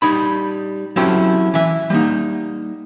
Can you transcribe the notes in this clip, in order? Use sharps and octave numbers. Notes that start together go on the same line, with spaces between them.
G3 D#4 B5
F#3 C4 C#4 E4 G4 A4
E3 E5
G3 A#3 D#4